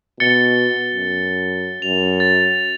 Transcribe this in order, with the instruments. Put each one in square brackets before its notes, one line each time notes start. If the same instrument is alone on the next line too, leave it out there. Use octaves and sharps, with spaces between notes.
[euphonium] B2 [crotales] A6 C#7 G7
[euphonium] F#2
[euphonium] F#2 [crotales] F7
[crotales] A6